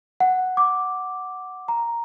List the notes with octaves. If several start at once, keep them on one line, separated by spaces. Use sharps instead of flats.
F#5
D6
A#5